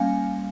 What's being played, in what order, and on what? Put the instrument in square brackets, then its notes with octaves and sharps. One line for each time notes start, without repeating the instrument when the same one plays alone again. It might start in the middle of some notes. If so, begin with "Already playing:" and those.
Already playing: [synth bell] G3 A#3 C#4 F5 G#5